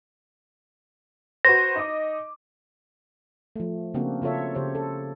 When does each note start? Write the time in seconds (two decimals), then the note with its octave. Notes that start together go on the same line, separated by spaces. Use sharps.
1.45 F#4 B4 C5 A#6
1.76 D#4 D#5 D6
3.56 F3 A3
3.94 C#3 A#3 C4 D4 F#4
4.22 C#3 F4 A4 C#5 E5
4.55 C#3 G4 C5 C#5
4.75 A4